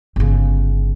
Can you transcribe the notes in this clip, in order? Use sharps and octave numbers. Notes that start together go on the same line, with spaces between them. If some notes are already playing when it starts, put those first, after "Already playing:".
G1 C#3